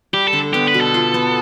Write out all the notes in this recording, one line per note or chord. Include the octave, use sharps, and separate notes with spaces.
G3 G4
A4
D3
B3 G4
B4
B2
A4
F4
B3